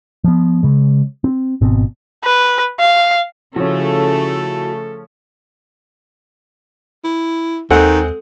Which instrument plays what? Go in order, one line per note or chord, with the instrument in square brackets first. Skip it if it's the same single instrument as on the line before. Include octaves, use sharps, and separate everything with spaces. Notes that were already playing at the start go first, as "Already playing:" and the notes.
[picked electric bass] F3 B3
C#3 G#3
C4
G#1 B2 C4
[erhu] B4
F5
[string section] C#3 A3 [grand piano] F3 C#4 [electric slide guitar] E4 F#4 [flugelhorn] A4
[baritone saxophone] E4
[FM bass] D#2 [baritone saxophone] D#3 [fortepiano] G#3 C4 F#5 [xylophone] A4